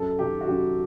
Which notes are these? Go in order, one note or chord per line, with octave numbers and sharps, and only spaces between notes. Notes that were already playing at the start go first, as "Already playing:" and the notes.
Already playing: F#2 A4
D#3 G4
F#4
F#2 G4